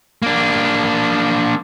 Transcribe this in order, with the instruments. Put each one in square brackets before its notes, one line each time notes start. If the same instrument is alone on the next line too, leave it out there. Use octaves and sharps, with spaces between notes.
[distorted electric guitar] A#3 D4